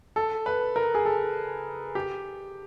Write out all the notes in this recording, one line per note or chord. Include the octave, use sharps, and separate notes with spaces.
A4
B4
A#4
G#4
A4
G4